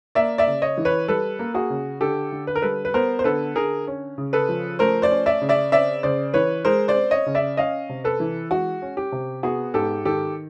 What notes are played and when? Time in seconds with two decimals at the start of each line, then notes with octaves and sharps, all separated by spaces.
0.15 A#3 D5 E5
0.38 D5 E5
0.47 C#3
0.62 C#5 D#5
0.77 E3
0.85 B4 C#5
1.08 G3 A4 B4
1.39 A#3
1.54 F#4 G#4
1.70 C#3
2.01 D3 G4 A4
2.32 D3
2.47 B4
2.56 A#4
2.62 G3 A4 B4
2.85 B4
2.94 B3 A#4 C5
3.19 C5
3.24 D3 A4 B4
3.55 D3 G#4 A#4
3.87 C#4
4.18 C#3
4.33 A4 B4
4.49 F3
4.79 A3 A#4 C5
5.02 C5 D5
5.11 C#4
5.26 D5 E5
5.41 C#3
5.49 D5 E5
5.72 C4 D5 E5
6.03 C#3 C5 D5
6.34 E3 B4 C#5
6.65 G#3 A#4 C5
6.88 C5 D5
6.95 C4
7.11 C#5 D#5
7.26 C#3
7.35 D5 E5
7.57 C#4 D#5 F5
7.89 C3
8.04 A4 B4
8.20 E3
8.51 G#3 F#4
8.82 C#4
8.97 G4
9.12 C3
9.43 B3 F#4 G#4
9.74 G#2 G4 A4
10.05 D#3 G4 A4